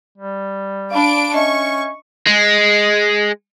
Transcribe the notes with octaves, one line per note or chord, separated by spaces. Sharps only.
G3
D4 F5 B5 D7
C#4 D#5 E5 C#6
G#3